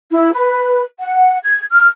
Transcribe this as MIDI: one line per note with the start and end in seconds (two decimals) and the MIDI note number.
0.10 0.32 64
0.33 0.82 71
0.99 1.38 78
1.43 1.64 92
1.72 1.87 89